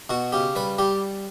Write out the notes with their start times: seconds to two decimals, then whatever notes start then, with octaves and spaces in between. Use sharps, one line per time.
0.10 B2 F#4
0.33 C#3 G4
0.56 G3 B4
0.78 G3 G4